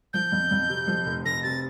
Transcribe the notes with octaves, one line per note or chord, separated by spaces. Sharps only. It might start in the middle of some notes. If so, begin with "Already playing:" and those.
F3 G6
F2
F2
C3
F3
F1
F1 A#6
C3 A6